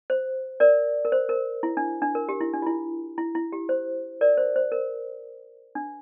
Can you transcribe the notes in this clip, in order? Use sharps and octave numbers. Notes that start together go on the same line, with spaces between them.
C5
A#4 D5
A#4
C5
A#4
E4
D4
D4
A#4
G4
E4
D4
F4
E4
E4
E4
G4
C5
A#4 D5
C5
C5
A#4
D4